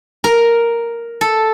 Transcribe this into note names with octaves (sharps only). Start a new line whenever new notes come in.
A#4
A4